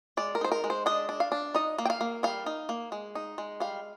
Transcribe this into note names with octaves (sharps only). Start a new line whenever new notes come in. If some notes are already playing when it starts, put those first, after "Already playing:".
G#3 D5
A#4
D#4 C5
A#4
G#3
C5
D4 D#5
D4
F5
D4
D#4 D#5
A#3
G5
F5
A#3
G3 F5
D#4
A#3
G#3
D#4
G#3
G3 F5